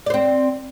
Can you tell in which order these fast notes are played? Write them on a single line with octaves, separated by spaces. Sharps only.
D5 C5 C4